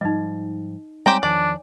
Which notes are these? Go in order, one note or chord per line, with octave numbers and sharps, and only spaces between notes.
G#2 F3 G3 D#4 D#5
G3 G#3 C4 G4 C5 C#5 G#5 A#5
E2 D#3 F3 D4 D5